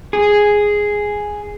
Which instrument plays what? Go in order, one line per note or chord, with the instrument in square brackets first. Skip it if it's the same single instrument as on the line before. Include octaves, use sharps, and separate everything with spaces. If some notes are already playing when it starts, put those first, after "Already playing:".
[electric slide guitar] G#4